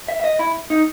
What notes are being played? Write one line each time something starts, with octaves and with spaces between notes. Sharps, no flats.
E5
E5
D#5
E4
D#4